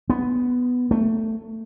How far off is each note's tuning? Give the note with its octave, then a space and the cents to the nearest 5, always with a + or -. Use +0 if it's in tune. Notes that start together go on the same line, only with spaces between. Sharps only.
B3 +5
A3 +15